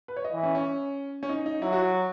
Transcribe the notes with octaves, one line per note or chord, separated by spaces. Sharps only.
B4
C#5
D#5
E3
C#4
C#4
C#4
D#4
D#4
F#3 E4
F#4